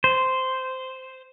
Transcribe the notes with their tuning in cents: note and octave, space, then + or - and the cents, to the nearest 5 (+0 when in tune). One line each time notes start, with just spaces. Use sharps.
C5 -10